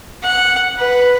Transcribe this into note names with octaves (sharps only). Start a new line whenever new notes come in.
F#5
B4